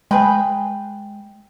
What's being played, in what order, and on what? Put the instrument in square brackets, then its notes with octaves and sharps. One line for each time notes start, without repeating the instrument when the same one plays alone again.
[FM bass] G#3 [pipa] G#4 B4 G5